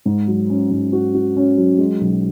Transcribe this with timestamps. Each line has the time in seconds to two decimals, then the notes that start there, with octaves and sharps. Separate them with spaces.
0.05 G#2
0.28 F#3
0.50 C#4
0.71 G#2
0.93 F#4
1.14 F#4
1.36 C#4
1.57 F#3
1.79 G#3
2.01 B1